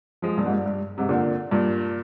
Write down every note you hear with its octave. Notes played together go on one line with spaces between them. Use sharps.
F3 G#3
G2 A#2
G#2
G2
G2
G#2 C3
A#2 D3
G2 A#2